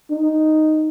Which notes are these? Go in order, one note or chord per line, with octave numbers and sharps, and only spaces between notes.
D#4